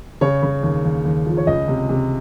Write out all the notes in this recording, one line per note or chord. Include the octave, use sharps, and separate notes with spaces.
C#3 C#5
C#3
D#2
D#2
D#2
F3
C#5
C#2 D#5
C3
C3